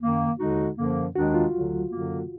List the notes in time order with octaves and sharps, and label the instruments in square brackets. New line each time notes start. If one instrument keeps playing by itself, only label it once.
[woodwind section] F#2 D#3 A#3
D#2 D3 G#3 D#4 F#4
F#2 D3 F3 A#3
[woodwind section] D#2 D#3 G#3 D4 [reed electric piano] F#4
[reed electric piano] F4
[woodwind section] D2 D3 F#3
F#2 D3 F#3 A#3